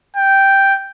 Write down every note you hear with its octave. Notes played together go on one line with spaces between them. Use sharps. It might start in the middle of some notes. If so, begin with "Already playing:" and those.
G5